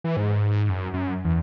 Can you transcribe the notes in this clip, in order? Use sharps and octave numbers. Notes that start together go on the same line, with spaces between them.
E3
G#2
F#2
F#2
E2